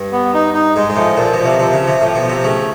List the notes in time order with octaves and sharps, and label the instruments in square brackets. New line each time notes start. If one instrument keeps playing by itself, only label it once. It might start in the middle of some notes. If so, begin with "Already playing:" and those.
Already playing: [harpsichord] G2
[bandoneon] B3
D#4
D#4
[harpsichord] G#2 [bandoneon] G#3
[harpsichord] G#2
[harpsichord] A2 [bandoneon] F3
[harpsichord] A#2 [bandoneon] F3
[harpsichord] B2
[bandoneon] F3
[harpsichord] C3
[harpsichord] C3 [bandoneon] F3
[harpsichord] C#3
[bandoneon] F3
[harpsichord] C3
[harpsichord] A2 [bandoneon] F3
[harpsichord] B2
[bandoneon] F3
[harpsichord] C3
[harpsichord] C#3 [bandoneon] A3